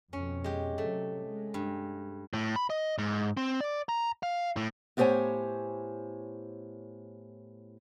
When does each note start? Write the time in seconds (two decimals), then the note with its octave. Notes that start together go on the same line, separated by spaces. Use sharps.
0.13 F2 B2 C#4
0.44 G#3 G4
0.78 C3 F#3 A3
1.24 G#3
1.54 G2
2.33 A2
2.56 B5
2.70 D#5
2.98 G#2
3.37 C4
3.61 D5
3.89 A#5
4.23 F5
4.57 A2
4.97 A2 B3 G4 C5 C#5 G#5